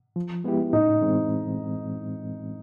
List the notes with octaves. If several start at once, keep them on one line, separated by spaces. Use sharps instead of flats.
F3
G#3 B3 E4 G4
A2 D#4
E3 G#3 C4